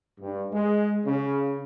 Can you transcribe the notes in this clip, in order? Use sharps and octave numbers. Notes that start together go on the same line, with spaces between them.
G2
G#3
C#3